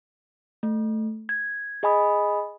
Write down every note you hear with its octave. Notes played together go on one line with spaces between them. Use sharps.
A3
G#6
G#4 D#5 G#5 B5 D#6